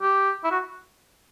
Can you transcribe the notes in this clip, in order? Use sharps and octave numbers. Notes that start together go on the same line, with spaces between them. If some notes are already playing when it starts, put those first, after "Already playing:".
G4
E4
F#4